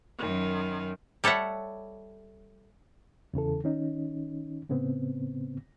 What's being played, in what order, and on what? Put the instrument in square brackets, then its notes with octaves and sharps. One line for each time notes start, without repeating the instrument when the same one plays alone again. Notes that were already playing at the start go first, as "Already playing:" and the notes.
[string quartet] F#2 D#3
[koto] G3 A4 C#5 E5 F#5
[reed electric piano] E2 C#3 E3 A4
D#3 C#4 D#4
A2 C#3 B3 C4